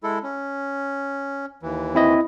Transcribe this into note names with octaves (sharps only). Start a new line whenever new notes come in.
G#3 E4 A4
C#4
D#2 E3
C4 E4 D#5